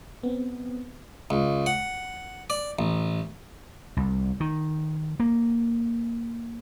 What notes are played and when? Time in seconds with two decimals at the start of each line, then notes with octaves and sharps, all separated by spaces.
0.23 B3 C4
1.30 C#2
1.66 F#5
2.50 D5
2.79 A1
3.97 C2
4.40 D#3
5.20 A#3